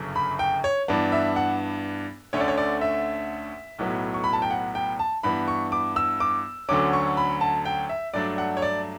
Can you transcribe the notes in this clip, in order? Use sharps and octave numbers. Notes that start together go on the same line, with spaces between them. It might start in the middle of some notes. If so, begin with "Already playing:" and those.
Already playing: G1 F#2 C#3
B5
G5
C#5
G2 E3 B3 D4
E5
F#5
D2 D3 A3 C#4 C#5
D5
C#5
D5
E5
B1 A2 F#3 B3
C#6
B5
A5
G5
F#5
G5
A5
G2 E3 B3 B5
C#6
D6
E6
D6
D2 D3 F#3 C#4 D6
C#6
B5
A5
G5
E5
G2 F#3 A3 D4 D5
F#5
C#5
D5